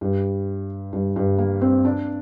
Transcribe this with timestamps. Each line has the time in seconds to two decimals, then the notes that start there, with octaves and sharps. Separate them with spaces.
0.01 G2
0.93 G2
1.16 G2
1.38 A#3
1.61 C4
1.85 D4